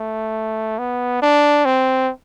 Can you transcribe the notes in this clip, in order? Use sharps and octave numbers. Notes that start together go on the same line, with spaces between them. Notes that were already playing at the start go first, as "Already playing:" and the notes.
Already playing: A3
B3
D4
C4